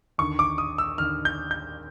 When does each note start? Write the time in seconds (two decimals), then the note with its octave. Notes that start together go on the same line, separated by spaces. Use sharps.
0.18 D#2 D3 C#6
0.39 D6
0.58 D#6
0.78 E6
0.98 D#2 D3 F6
1.25 G6
1.51 G6